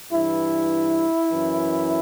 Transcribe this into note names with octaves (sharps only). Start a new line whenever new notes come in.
G2 E3 E4
F#2 E3